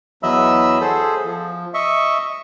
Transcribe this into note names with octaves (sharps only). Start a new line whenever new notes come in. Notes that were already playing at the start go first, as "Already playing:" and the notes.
E2 F#3 D#5 E5 B5 E6
G#4 A4 C5
F3
D#5 E5 C#6